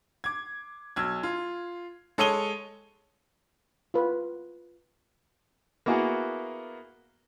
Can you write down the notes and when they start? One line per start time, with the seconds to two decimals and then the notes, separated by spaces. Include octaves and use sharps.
0.24 D6 G#6
0.96 B1 E6 G#6
1.23 F4
2.18 G#3 A4 C#5 D#6 D#7 G7
3.94 F4 B4
5.86 A#3 B3 E4 F#4 G#4 A#4